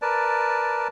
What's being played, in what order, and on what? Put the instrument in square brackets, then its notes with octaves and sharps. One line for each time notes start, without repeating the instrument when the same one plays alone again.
[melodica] A#4 B4 D5 A5